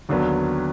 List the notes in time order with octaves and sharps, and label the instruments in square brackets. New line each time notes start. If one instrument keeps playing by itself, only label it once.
[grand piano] D#2 D3 F#3 B3